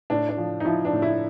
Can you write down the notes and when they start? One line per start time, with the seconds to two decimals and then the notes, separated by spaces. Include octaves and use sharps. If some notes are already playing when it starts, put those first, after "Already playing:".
0.10 A2 D4
0.29 D4
0.37 F3
0.60 D#4
0.65 F3 E4
0.85 D4
0.93 A2
1.02 E4